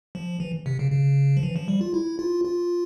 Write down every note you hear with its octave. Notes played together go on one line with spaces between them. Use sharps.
F3
E3
C3
C#3
C#3
F3
E3
F3
G3
F4
E4
F4
F4